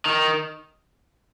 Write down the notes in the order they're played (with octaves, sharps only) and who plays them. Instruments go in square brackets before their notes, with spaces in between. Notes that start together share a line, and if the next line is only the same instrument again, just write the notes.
[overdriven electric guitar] D#3